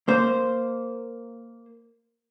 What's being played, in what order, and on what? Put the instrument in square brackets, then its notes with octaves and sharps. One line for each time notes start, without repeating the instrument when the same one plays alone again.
[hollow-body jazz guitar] A#3 C5